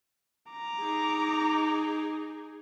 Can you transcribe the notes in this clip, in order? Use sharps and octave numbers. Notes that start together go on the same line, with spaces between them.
A#5 D6
D#4 G#4